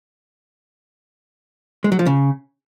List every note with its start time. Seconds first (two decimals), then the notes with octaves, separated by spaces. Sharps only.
1.84 G#3
1.92 F#3
1.99 F3
2.06 C#3